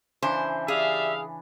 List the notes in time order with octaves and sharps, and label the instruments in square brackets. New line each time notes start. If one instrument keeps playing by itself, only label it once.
[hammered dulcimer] C#3 E3 D4 [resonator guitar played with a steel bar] C5
[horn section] G4 D5 E5 [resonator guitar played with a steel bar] G#4 [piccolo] F5